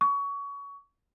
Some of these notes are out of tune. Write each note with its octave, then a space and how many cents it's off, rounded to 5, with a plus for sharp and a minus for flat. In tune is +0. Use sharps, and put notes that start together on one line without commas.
C#6 +25